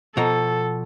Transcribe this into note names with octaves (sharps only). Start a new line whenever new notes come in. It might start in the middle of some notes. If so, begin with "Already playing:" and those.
B2 F3 A4 A#5